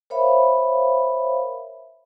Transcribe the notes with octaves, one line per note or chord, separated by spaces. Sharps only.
A#4 C5 C#5 E5 F5 B5